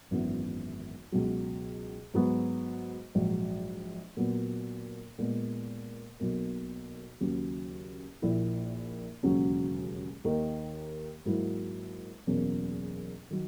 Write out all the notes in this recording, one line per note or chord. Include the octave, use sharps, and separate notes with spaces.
G#1 F#2 E3 B3
C#2 B2 F#3
G#2 F#3 B3 F#4
A#1 G#2 F#3
A#2 F#3 B3
A#2 G#3 B3
B1 B2 A#3
D#2 C#3 F#3
A#1 A#2 A#3 E4
E1 D#2 C#3 F#3 C#4
D#2 D#3 A#3
G#2 F#3 A#3 E4
F#1 E2 B2 A#3 C#4
D#3 F#3